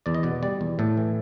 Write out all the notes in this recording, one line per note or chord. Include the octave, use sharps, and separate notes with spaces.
E2 D5
D#5
B2 D5
G3 D5
E2
A2 A4
E3